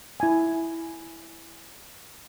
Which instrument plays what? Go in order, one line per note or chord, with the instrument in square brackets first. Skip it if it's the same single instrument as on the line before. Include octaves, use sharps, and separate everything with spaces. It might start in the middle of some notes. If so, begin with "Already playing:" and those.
[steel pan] E4 G#5